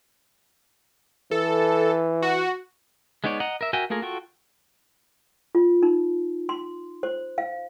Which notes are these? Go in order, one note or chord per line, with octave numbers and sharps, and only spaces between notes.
E3 A4
F#4
G#3 B3 D#4 C#5 D5
D#5 F#5 A#5
A#4 E5
F#4 A#4 E5 G5 G#5
A3 A#3 F4 G#4 A#4
F4 F#4 A4 G5 C#6
F4
D#4
C6
C5
F5